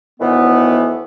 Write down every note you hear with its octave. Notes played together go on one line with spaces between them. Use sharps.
D2 A2 D#3 E3 B3